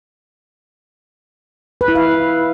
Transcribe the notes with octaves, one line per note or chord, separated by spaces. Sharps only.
B4
E4
F5